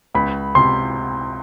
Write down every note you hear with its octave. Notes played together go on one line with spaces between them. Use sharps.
C#2 B5
C3 C6